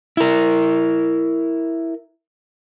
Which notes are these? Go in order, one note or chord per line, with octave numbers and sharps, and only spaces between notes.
E4 A#4